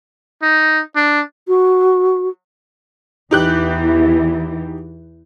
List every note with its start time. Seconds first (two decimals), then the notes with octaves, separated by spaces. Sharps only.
0.43 D#4
0.96 D4
1.48 F#4
3.31 E2 E3 D#4 G4 F#6